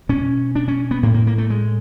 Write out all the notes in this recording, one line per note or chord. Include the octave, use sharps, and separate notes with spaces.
B2 C#4
D4
C#4
B3
A2 A#3
A#3
A#3
A3
G#3